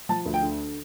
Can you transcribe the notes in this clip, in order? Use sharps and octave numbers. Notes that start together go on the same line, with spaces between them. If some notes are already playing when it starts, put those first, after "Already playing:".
F3 A5
D2
G5
D3